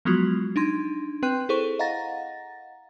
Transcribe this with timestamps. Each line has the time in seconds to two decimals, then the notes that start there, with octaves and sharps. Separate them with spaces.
0.05 F3 F#3 G#3 B3 F4 F#4
0.56 D4 D#4 C6 G#6
1.23 C4 B4 G5 C6 F#6 D#7
1.49 E4 G#4 A4 C5 C#6 D#7
1.79 D#5 F5 F#5 A#5 A6 A#6